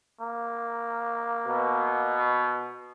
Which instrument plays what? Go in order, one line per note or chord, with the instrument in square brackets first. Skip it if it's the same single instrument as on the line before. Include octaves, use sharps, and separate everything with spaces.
[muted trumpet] A#3
[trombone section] B2